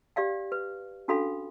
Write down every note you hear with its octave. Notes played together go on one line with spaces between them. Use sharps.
G4 D5 F5 G5
B4
C#4 D4 F#4 A4 F5 B5